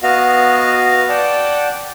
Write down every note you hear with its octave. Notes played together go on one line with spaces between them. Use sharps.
B3 F#4 D#5 F5
D5 F#5 G5 A5